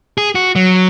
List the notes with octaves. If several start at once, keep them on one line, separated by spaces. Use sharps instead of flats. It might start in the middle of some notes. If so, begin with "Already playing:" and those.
G#4
F#4
F#3